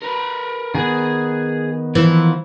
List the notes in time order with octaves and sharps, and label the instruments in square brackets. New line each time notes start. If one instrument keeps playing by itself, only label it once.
[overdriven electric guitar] A#4 B4
[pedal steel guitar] D#3 B3 B4 [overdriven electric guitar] G#4
[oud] E3 [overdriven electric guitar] F3